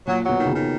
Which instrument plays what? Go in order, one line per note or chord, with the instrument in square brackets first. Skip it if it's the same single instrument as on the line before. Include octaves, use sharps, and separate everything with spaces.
[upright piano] A#2 [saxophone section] F#3
[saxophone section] F#3
[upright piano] B2
[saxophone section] D#3
[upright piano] C#3
[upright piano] B2 [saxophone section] D#3